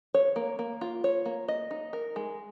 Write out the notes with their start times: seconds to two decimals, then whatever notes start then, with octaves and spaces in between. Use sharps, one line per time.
0.14 C#5
0.36 A#3
0.59 A#3
0.81 F4
1.04 C#5
1.26 A#3
1.48 D#5
1.71 D#4
1.93 A#4
2.16 G#3